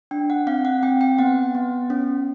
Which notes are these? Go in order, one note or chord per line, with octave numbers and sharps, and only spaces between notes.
D4 G5
F#5
C4 F5
F#5
C4 G5
G5
B3 F#5
B3
C#4